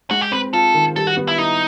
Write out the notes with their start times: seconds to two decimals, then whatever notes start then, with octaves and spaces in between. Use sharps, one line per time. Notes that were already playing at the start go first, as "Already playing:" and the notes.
0.11 G#3 F#4
0.21 G4
0.31 C4 B4
0.53 F4 A4
0.74 D#3
0.96 G3 A4
1.07 F#4
1.17 B3
1.28 E4
1.38 D#4 E4